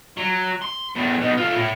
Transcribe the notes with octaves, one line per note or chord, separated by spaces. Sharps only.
F#3
C6
E2 A2
B2 D#4
A3 F4
A2